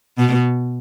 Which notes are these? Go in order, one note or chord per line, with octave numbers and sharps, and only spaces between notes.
B2